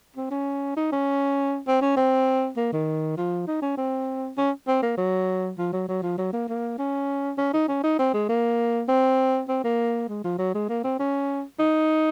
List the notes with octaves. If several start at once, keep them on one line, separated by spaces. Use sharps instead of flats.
C4
C#4
D#4
C#4
C4
C#4
C4
A#3
D#3
F3
D#4
C#4
C4
C#4
C4
A#3
F#3
F3
F#3
F#3
F3
F#3
A#3
A#3
C#4
C#4
D#4
C#4
D#4
C4
G#3
A#3
C4
C4
A#3
G#3
F3
F#3
G#3
A#3
C4
C#4
D#4